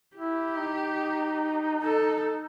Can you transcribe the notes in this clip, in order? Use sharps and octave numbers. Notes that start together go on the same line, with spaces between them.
E4 G4
D#4
A4